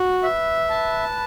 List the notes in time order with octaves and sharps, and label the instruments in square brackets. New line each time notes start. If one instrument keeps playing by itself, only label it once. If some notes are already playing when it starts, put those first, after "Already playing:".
Already playing: [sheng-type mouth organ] F#4
[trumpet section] B4 [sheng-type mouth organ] E5
[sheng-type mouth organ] A5